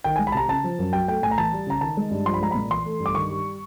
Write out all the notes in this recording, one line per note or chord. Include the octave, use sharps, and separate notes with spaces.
D#3 G5
G#3 G#5
B5
C3 A5 A#5
C#3 A5
F3
F#2
F#3 G5
A3 G5
A2 G#5
A#5
E3 A5
G3
C#3 A#5
D#3 A5
G#3
G2
F3 C6
B5
G#3 A#5
A#2 B5
E3 C6
A3
G2
D6
D#3 C#6
G3